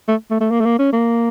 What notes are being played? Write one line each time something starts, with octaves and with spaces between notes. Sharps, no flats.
A3
A3
A3
A#3
A3
A#3
C#4
A#3